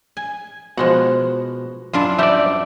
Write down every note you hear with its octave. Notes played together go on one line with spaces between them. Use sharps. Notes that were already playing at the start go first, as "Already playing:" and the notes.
G#5
B2 F3 G#3 F#5
F#2 D4 E4 F4
G3 F#4 G4 D5 E5